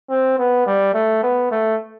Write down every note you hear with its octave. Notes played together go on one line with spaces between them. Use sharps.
C4
B3
G3
A3
B3
A3